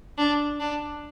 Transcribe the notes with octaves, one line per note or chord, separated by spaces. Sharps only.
D4
D4